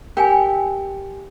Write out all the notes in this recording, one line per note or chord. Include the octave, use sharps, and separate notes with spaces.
G4 A#4 G5 G#5